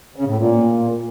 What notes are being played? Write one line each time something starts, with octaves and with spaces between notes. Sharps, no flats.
C#3
A2
A#2